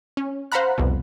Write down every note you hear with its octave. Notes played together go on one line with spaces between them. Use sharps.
C#4
C5 F5 F#5 A#5 B5 F#6
C2 F2 B2